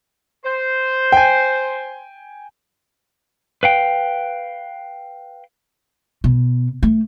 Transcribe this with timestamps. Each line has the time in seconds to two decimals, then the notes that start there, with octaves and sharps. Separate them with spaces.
0.44 C5
1.12 G5 G#5
3.63 B4 F5 G5
6.24 B2
6.83 A3